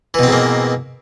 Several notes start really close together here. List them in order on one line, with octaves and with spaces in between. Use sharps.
E3 B2 C4 G#2 A#3